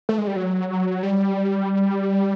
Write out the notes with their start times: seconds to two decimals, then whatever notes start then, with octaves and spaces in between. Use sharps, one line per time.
0.09 A3
0.18 G#3
0.27 G3
0.36 F#3
1.03 G3